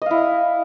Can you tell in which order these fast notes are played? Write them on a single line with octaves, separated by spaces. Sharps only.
D#5 F5 E4